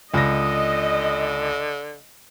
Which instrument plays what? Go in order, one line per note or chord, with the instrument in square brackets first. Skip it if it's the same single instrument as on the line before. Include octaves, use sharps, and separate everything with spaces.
[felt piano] C#2 A#6 [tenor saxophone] D3 [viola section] D#5